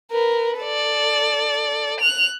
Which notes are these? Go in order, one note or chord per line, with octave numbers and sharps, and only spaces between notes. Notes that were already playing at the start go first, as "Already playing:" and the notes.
A#4 B4
A4 D5
F#6 F7